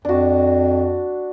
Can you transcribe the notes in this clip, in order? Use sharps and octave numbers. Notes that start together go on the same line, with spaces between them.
F2 D4 F#4